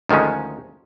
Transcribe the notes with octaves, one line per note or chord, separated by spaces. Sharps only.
D2 D#3 F3 G#3 C#4